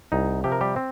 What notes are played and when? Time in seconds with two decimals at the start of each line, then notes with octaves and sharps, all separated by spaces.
0.12 C2 D#4
0.44 C3 F3 G4
0.52 A#4
0.61 G3 G4
0.76 C4